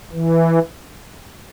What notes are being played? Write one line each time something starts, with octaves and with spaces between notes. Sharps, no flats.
E3